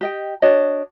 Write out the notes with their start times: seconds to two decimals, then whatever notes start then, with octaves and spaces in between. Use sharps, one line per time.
0.01 G4 D#5 G5
0.42 D4 F#4 C#5 D#5